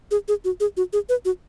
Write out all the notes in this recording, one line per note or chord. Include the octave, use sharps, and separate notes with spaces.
G#4
G#4
F#4
G#4
F#4
G#4
B4
F#4